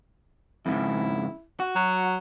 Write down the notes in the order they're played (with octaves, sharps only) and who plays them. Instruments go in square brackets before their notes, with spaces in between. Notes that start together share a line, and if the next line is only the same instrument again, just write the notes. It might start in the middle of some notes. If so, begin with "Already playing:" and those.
[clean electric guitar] F2 G#2 C#3 [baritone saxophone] E4
[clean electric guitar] F#4
[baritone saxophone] F#3